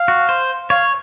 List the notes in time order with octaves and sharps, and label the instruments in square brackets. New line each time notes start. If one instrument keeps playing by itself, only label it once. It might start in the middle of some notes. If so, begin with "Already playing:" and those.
Already playing: [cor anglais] F5
[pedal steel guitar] F#4
C5
[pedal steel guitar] C#5 [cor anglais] F5